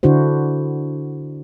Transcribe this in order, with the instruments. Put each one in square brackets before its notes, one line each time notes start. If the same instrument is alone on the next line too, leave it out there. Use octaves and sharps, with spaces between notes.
[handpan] D3 D4 E4 F#4 C5